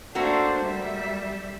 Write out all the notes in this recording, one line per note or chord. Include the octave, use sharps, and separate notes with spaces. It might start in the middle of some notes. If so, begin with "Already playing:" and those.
A3 A#3 D4 F#4 C5
G3 E5